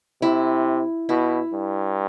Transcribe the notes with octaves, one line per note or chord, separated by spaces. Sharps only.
C3 E4
B2 E4
G2